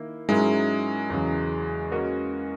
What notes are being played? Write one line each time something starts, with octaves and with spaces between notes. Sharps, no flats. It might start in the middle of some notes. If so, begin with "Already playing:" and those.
Already playing: D#3 A#3 E4
G#2 F#3 G#3 C#4 E4 A#4
E2 C#3 F#3
A#3 C#4 F#4 A#4 D#5